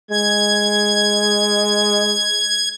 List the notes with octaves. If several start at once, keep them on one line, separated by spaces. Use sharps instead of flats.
G#3 G#6